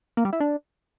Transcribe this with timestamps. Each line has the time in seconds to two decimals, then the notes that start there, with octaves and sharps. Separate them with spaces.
0.17 A#3
0.25 G3
0.33 E4
0.40 D4